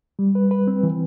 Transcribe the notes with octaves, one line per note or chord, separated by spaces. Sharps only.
G3
B4
B4
C4
E3